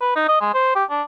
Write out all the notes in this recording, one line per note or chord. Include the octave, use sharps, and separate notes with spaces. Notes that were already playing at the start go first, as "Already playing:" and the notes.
B4
D#4
D#5
G#3
C5
G4
D4